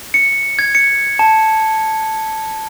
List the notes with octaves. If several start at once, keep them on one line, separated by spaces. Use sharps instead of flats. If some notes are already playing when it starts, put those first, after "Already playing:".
C#7
G#6
C#7
A5